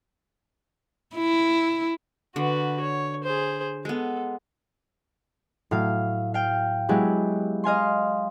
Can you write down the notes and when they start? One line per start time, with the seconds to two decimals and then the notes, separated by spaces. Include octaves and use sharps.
1.15 E4
2.36 D3 F#4 B4
2.81 C#5
3.23 G#4 C5
3.85 G#3 B3 A4
5.71 A2 F#3 F5
6.34 F5 G5
6.89 F#3 G#3 B3 E4 G4
7.64 D#5 F5 G#5 C6